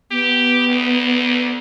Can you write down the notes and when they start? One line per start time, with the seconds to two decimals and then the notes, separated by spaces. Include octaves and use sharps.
0.11 B3 G4
0.69 D2